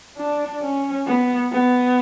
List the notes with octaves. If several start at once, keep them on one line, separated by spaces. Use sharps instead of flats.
D4
C#4
B3
B3